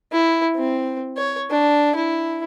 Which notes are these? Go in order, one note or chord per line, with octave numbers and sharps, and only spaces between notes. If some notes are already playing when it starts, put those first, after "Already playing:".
E4
C4
C#5
D4
E4